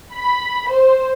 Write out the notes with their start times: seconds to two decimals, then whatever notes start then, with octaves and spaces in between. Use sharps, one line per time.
0.13 B5
0.70 C5